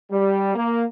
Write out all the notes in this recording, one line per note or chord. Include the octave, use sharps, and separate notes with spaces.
G3
A#3